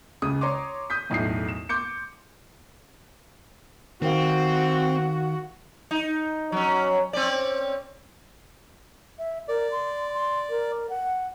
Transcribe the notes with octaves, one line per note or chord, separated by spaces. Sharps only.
C#2 C#3 D#6
C#5 A#5 C6 D6
D#6 G6 B6
E1 B1 A2 D#6 C7
E7
C6 D6 G6 C#7
D#3 C4 F#4 F5
D#4
F#3 C#4
C4 C#4 D5
E5
A#4 D5
C6
C6
A#4
F#5